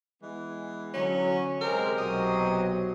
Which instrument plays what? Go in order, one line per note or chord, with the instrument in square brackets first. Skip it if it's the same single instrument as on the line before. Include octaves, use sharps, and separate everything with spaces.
[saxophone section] E3 G#3 B3
[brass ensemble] D3 F#3 [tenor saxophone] C#4
[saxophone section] C3 G4 C5 [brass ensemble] G#3 [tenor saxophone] A#4
[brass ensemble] B1 B2 F#3 [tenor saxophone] D#5